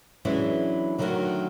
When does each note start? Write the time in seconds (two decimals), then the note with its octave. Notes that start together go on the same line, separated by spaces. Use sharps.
0.25 E3 F#3 G#3 C#4 D4 E4
0.99 D3 D#3 F#3 A3 F#4 A#4